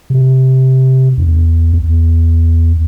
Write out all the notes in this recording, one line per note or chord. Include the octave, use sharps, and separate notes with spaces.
C3
E2
E2